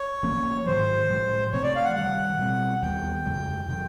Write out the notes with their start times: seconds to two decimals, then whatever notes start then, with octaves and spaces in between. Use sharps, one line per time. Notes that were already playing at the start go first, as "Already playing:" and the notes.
Already playing: C#5
0.23 A#2 F3 A#3 C#4
0.66 G#2 D#3 F#3 C5
1.10 A2 F3 G#3
1.52 C3 F3 A3 C4 C#5
1.63 D5
1.76 F5
1.84 F#5
1.95 G2 D#3 G3 F#5
2.39 B2 G3 C4
2.82 D#2 D#3 G3 B3 G5
3.26 F2 C#3 F3 G#3
3.68 C3 D#3 F#3 G5